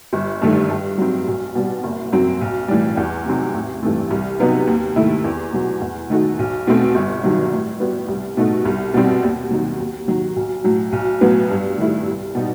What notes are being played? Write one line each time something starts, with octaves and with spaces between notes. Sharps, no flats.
G1
G2 D#3 A3
G2
F#3 C4
B1
B2 G3
F#1
F#2 F#3 C4
B1
A2 E3 G3
E2
C3 F#3 C4 D#4
A1
G2 E3 A3 C4
C2
C3 F#3 B3 D#4
D#2
D#3 A3 E4
E2
B2 F#3
E2
D#3 A3 D#4 F#4
B1
B2 A3 C4
G1
G2 D#3 F#3
A2
G3 B3 F#4
C2
B2 A3 D#4 F#4
C2
B2 G3 C4
D#2
D#3 F#3
D#2
D#3 F#3
B1
A2 F#3
B1
A2 F#3 B3
G2
D#3 A3 E4
C2
B2 G3 D#4